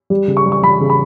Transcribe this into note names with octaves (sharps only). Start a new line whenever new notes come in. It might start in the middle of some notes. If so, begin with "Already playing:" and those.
G3
C#3
C#6
G3
C#6
G3 B5
C#3
B5